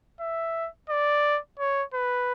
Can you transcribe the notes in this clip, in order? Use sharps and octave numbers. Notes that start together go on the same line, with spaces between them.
E5
D5
C#5
B4